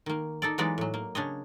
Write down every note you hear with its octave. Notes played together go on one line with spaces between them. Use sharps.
D#3 A#3
D#4 A4 D5
E3 F#3 G#3 B3 D#4 D5
A2 F#3
A#3
C#3 D4 C#5 D#5